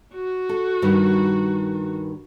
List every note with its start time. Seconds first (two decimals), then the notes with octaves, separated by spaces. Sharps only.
0.14 F#4
0.49 A4
0.82 G2 D#3 G3